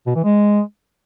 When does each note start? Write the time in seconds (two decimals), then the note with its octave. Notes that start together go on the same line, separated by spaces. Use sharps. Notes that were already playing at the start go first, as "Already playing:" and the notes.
0.07 B2
0.16 E3
0.25 G#3